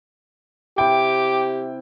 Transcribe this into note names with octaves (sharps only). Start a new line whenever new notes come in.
C3 E4 G4 G5 D6